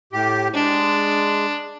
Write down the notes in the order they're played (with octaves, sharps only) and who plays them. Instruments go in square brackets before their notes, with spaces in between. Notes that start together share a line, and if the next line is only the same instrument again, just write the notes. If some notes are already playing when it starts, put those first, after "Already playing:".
[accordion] A2 G4
[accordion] G#3 [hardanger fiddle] D4